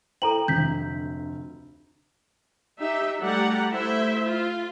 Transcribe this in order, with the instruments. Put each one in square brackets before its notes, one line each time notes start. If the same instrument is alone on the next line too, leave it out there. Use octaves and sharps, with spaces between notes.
[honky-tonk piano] E4 C5 G5 [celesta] A4 A#5 F#7
[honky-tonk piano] F1 D2 [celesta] G6 B6
[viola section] D#4 G4 E5
G3 A3 G4 D5 F#5 A#5
A3 E4 C5 E5
F4